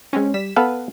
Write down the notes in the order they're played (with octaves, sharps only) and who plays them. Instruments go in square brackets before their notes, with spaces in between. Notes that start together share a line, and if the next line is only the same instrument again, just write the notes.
[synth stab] G#3 C4 C#4
G3 B6 E7
[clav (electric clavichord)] B3 A4 F5 [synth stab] B4